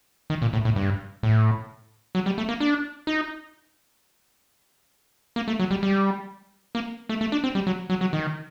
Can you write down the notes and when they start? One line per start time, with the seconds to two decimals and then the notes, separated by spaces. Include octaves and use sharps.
0.30 D#3
0.42 A#2
0.53 A2
0.65 A2
0.76 G2
1.23 A2
2.15 F#3
2.26 G3
2.38 A3
2.49 A#3
2.60 D4
3.07 D#4
5.36 A#3
5.48 A3
5.60 F#3
5.71 G3
5.83 G3
6.75 A#3
7.09 A3
7.21 A3
7.32 D4
7.44 C4
7.55 G3
7.67 F#3
7.90 F#3
8.01 F#3
8.13 D#3